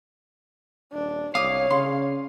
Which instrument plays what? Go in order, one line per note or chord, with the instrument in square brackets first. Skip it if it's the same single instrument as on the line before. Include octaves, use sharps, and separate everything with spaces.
[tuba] D#1 [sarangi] D4
[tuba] C2 [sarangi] C#5 [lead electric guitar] F5 [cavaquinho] D6 D#6
[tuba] C#3 [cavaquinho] C6